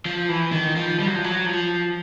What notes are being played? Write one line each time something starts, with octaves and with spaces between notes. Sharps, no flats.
F3
E3
D#3
F3
G3
F#3
F3
F#3
F3